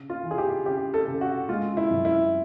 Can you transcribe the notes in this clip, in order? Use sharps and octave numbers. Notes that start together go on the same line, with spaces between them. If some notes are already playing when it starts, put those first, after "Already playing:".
Already playing: C#3
F4
E3
G#4
G4
C#3 G4
A4
C#3
F#4
G#3 F4
E4
F#2
E4